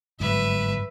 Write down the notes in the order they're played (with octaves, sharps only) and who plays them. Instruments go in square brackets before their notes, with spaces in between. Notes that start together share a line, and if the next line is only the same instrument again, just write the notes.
[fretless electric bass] G1 G#2 F#3 [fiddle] B4 E5